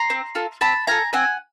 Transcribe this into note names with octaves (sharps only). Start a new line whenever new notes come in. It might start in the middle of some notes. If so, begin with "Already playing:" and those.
Already playing: A#5 C6
C4
F4 A4
C4 A5 B5
F4 A4 G#5 A#5
C4 F#5 G#5